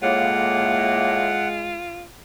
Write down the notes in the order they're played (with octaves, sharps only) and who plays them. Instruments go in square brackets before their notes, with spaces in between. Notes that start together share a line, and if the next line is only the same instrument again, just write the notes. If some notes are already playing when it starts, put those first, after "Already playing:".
[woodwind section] A2 A#3 [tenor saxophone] G#3 [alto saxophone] F4 [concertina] F#5